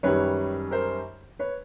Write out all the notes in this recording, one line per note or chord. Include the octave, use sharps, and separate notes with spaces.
F#2 D#3 G3 B4 C#5
A#4 C5
B4 C#5